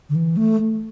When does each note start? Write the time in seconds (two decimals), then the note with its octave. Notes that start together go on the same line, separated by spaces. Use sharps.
0.10 D3
0.15 E3
0.37 A3